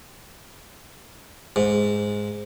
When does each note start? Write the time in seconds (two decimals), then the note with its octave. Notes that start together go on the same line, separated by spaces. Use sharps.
1.56 G#2